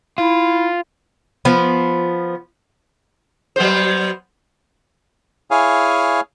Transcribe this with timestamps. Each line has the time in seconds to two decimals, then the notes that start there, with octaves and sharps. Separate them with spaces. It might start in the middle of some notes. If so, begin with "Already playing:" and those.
0.18 E4 F4
1.45 F3 B3
3.56 F#3 B3 C5
5.51 E4 G#4 C#5 F5 G#5